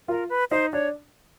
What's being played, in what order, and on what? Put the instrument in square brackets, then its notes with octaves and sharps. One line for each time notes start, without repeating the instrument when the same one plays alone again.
[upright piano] F4 [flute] A#4
[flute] B4
[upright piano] D#4 [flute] C5
[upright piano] D4 [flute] C#5